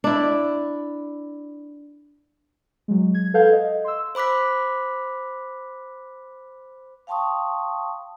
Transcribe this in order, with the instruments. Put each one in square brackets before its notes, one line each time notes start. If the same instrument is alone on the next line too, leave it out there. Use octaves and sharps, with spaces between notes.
[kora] D4 E4
[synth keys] F#3 G#3
G#6
A4 B4 F5 F#5 G6 G#6
D#5
C6 E6
[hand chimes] C5 B5 D6 F#6 B6
[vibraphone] F5 G5 A5 C6 C#6 D#6